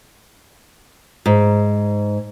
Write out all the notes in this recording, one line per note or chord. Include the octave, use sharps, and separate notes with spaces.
G#2